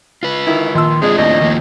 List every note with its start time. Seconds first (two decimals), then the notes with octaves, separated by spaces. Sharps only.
0.23 F4 B4
0.47 D#3 E4
0.75 A#1 D#3 F4 E6
1.02 G#3 C4 D4 F4 G#4
1.18 D#2 A2 D#5
1.41 D#3 F3 A#3